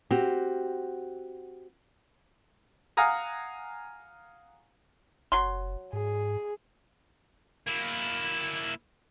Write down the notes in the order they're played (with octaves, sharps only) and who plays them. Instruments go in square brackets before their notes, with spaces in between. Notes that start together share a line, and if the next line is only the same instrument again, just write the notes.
[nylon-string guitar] C4 F#4 G4
[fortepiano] F5 F#5 G#5 A#5 D#6
[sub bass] F#1 [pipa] F#3 C6
[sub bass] G#2 [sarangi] G#4
[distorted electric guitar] A#3 E4